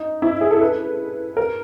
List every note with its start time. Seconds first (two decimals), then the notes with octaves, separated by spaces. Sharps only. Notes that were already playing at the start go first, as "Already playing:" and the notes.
Already playing: D#4
0.22 E4
0.41 G#4
0.51 A4
0.61 B4
1.37 A#4